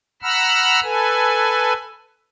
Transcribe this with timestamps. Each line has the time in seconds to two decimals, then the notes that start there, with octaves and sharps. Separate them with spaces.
0.22 F#5 A#5 B5 E6 F6
0.83 A4 B4 G#5